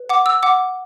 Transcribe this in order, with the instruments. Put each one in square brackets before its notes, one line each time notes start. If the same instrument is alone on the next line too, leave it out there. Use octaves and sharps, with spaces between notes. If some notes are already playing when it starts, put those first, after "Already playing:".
Already playing: [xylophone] B4
F#5 D6
E6
F#5 D6